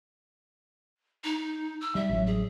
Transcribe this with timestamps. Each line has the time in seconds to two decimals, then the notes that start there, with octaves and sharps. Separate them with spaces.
1.24 D#4
1.81 E6
1.95 G3 E5
2.09 A1 F#3
2.26 G#4